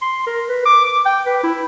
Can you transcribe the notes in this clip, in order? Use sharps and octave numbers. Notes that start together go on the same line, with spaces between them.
C6
A#4
B4
D6
D6
G5
B4
E4